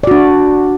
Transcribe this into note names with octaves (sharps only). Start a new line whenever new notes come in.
D4 F#4 D5